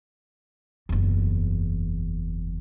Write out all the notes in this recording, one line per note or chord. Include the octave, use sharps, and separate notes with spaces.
F#1 E2